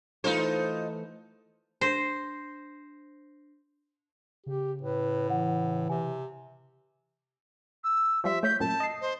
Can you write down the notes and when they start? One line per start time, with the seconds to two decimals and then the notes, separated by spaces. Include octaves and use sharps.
0.24 E3 A3 D#4 F4 A4 C5
1.81 D4 C5 A#6 C7
4.46 C#3 G4
4.82 A2 B4
5.30 E3 F#5
5.89 C3 G#5
7.84 E6
8.24 F3 G3 E5 C6
8.43 A3 C#5 G6 B6
8.60 F#2 A#2 A5
8.80 D#5 C7
9.01 C5